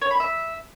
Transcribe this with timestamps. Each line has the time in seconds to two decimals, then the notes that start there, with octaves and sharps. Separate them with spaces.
0.02 C#5
0.11 B5
0.20 E5